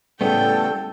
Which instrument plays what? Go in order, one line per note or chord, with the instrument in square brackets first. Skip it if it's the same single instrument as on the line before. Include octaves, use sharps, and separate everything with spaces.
[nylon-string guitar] A2 C#3 G3 [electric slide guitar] A3 B3 [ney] A4 [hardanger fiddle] G5